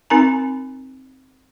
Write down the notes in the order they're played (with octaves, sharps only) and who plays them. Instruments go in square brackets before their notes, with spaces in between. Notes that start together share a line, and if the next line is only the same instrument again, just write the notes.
[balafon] C4 D#4 A#4 G#5 A#5